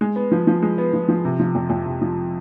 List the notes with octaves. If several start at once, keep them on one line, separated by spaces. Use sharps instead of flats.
G#3
B3
F3
F3
G#3
B3
F3
F3
C3
F3
F2
F2
C3
F3